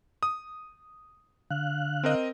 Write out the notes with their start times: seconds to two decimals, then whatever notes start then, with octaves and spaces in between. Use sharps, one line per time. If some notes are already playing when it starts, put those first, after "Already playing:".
0.23 D#6
1.51 D3 F5 F#6
2.04 C4 A#4 D#5